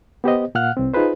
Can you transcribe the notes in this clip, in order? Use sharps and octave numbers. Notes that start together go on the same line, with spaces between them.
B3 G4 C5 D#5
A#2 F5 F#5 F6 F#6
C2 C4
D#4 F4 G#4 B4 C5